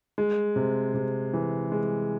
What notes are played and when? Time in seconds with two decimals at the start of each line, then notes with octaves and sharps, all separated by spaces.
0.18 G#3
0.56 C3
0.94 C3
1.33 E3
1.72 G#3